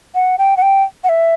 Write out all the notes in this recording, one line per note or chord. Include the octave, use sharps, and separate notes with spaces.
F#5
G5
F#5
G5
F#5
E5